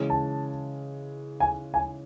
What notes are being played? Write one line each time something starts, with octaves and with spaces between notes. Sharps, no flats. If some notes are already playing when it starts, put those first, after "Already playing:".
Already playing: C#3 E3 G#3 C#4
A5
G#5
G#5